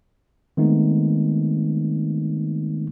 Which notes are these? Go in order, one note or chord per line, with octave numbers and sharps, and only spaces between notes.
D#3 G#3 A3 B3 C4 D#4